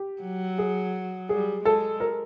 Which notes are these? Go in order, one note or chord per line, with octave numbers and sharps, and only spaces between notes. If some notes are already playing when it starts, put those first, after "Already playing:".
Already playing: G4
F#3
G#4
G3 G#4
G#3 A4
A#4